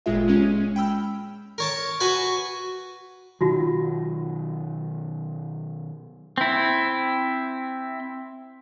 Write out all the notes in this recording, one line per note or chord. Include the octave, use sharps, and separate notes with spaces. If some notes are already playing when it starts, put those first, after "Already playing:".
G1 A#2 G#3 F4 E5
G#3 C#4
G5 B5 E6 F6
A#4 C#5 A5
F#4 B4 G#5
B2 D#3 F#3 D#4 F4 F#4
C4 E4